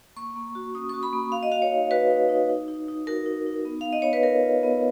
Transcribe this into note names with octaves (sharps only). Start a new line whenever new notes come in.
A#3 C#6
A#3
F#4
C#4 D#6
C#6
F#4
B5
A#3
F#4 F5
D#5
F#4 F5
C#5
D#4
F#4 B4
D#4
D#4
D#4
D#4
D#4
F#4 A#4
D#4
D#4
B3
B3 F5
D#5
B3 C#5
B4
F4 A#4
F4
B3